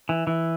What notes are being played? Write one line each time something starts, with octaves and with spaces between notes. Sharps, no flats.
E3
E3